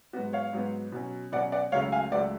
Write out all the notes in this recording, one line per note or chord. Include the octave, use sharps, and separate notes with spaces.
G#2 F#3 B3 F#4
C#5 F5
G#2 F#3 B3
B2 F#3 C#4
B2 F#3 C#4 D5 F#5
D5 F#5
C#2 C#3 F#3 A3 C#5 F5
F5 G#5
C#2 C#3 F#3 A3 D5 F#5